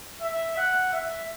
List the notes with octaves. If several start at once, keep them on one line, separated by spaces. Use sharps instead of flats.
E5
F#5
E5